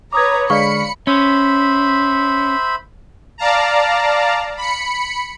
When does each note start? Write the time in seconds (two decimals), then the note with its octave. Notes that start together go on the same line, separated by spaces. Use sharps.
0.13 B4 C#5 A#5 D6 D#6 G#6
0.50 D3 G#3 D5 F5 B5 C#6 C#7
1.07 C#4 C5 E5 B5
3.38 D5 F5 A5 A#5
4.57 B5 C#7